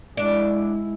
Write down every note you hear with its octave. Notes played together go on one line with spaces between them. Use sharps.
G#3 D4 E4 D5